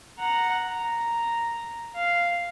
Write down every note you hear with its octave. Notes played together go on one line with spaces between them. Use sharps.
F#5 A#5
A#5
F5